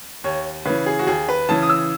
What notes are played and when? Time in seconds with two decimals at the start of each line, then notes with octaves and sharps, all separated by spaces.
0.24 D#2 C#5
0.65 C#3 E3 B4
0.86 G#4
0.99 F#4
1.07 D#2 G#4
1.29 B4
1.49 C#3 E3 A5
1.63 D#6
1.69 E6